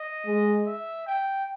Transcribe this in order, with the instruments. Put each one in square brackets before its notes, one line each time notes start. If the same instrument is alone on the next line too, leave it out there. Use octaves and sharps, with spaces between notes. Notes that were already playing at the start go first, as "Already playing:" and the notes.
Already playing: [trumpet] D#5
[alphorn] G#3
[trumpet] E5
G5